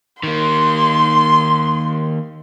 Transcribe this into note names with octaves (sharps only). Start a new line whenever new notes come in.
D#3 A#3 C6